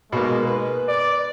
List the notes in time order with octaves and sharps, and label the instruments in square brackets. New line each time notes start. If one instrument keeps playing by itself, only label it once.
[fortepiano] B2 A#3 [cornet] G#3
[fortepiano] B4
[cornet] D5